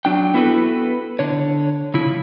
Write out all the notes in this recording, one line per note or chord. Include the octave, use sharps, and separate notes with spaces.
F#3 D4 G5
B3 E4 F#4 A4 B4
D3 C#5
C#3 F3 E4